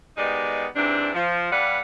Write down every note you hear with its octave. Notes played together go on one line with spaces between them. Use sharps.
D#3 G#3 B3 D#4 G4 D5
G#2 C3 E3 C4 D4
F3
G2 G3 D4 B4 F5 F#5